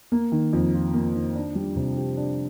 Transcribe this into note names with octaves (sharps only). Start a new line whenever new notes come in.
A#3
D#3
F2
F4
A#3
D#3
D4
G3
C3
G4
D4